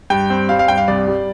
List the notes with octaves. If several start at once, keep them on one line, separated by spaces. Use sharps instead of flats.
G2 G5
C4
G3 F5
F5
G2 G5
F5
C2 D5
G3